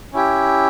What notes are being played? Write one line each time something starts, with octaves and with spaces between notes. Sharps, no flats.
C#4 E4 G4